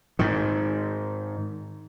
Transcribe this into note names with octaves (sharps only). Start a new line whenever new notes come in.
G#2 D#3